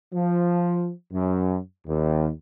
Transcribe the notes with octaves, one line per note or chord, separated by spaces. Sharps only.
F3
F#2
D#2